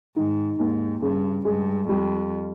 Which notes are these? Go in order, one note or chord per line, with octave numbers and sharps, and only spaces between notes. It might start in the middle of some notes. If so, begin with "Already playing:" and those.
G#2 D#3
D#2 G#2
G2 C#3
G2 G#3
F2 G3